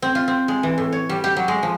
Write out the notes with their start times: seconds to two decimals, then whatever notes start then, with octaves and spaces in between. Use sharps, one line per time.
0.02 C4
0.15 F4
0.28 C4
0.48 G#3
0.63 E3
0.78 A2
0.92 C#5
1.09 G3
1.24 G4
1.37 F#3
1.48 G#3
1.63 F3